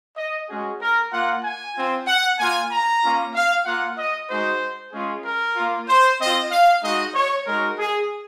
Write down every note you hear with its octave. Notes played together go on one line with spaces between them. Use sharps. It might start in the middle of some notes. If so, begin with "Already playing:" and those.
D#5
G#3 C#4 F#4 G#4
A#4
A#3 F4 F#5
G#5
C4 F4
F#5
A#3 F4 G#5
A#5
A#3 C#4 F4
F5
A#3 F4 F#5
D#5
G#3 D#4 F#4 C5
G#3 C#4 F4 G#4
A#4
A#3 F4
C5
C4 F4 D#5
F5
G#3 D#4 F#4 D#5
C#5
G#3 D#4 F#4 A#4
G#4